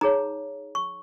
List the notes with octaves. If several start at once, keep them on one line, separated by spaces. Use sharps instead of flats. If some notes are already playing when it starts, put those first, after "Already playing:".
D#4 G#4 C#5 A#5
C#6